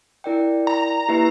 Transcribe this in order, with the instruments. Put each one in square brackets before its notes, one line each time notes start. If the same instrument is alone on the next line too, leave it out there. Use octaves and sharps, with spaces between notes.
[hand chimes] E4 A#4 D5 G5
[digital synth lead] A#5
[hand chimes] A#3 E4 G4 B4 E5